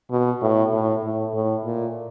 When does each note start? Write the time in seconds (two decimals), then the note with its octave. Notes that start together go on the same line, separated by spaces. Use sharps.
0.10 B2
0.42 A2
0.73 A2
1.04 A2
1.33 A2
1.64 A#2